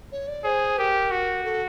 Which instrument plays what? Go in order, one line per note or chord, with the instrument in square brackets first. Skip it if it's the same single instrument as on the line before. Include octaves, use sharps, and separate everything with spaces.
[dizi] C#5
D5
[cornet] G#4 [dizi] C5
[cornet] G4 [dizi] A#4
[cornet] F#4
[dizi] A4